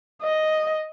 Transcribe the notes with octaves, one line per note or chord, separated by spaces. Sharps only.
D#5